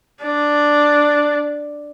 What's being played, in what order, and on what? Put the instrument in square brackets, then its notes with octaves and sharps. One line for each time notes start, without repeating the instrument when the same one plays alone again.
[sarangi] D4